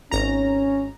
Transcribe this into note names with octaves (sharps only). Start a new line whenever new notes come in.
G#1 C#4 A#5